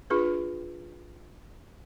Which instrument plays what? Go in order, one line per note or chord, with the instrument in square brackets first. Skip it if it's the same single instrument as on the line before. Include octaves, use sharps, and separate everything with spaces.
[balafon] D4 F4 G#4 B4